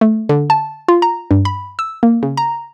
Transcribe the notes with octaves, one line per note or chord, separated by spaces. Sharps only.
A3
D3
A5
F4
A#5
G2
B5
E6
A#3
C#3
A#5